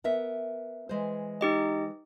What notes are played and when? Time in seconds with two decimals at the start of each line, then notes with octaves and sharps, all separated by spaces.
0.04 B3 A#4 E5
0.89 E3 G#3 C5
1.41 D#4 G4 D#5